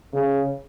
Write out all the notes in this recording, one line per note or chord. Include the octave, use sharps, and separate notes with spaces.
C#3